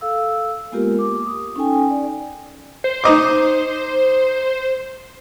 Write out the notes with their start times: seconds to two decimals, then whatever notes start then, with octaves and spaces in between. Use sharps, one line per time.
0.01 A4 F5 E6
0.72 G#3 A#3 B3 F4 G4 A#4
0.99 D6
1.26 D#6
1.56 C#4 D#4 A4 G5 G#5
1.90 D5
2.84 C5
3.04 D#4 D#5 D6